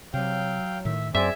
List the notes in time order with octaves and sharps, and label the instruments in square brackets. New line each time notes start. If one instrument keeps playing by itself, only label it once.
[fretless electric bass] C3 [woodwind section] F#3 [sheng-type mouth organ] F5 G5
[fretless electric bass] A2 D#3 [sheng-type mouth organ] E5
[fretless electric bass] F#2 [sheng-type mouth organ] C4 D5 [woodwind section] G#4 G#5 [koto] E5